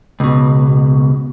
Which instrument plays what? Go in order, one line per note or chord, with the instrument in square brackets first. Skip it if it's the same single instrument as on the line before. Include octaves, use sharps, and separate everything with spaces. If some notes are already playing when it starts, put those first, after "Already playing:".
[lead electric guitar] C#2 B2